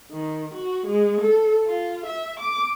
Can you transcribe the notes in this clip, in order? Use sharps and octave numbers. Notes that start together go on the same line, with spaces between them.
D#3
F#4
G#3
A4
F4
E5
D6